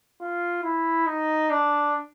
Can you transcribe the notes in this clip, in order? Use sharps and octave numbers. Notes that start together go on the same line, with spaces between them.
F4
E4
D#4
D4